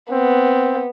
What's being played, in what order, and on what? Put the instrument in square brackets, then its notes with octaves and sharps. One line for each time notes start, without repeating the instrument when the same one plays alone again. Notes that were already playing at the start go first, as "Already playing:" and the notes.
[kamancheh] B3 [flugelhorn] C4